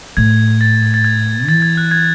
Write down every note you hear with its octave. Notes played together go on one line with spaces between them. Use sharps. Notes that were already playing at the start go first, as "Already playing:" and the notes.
A2 G#6
A6
A6
G#6
E3 A6
G#6
F#6
G#6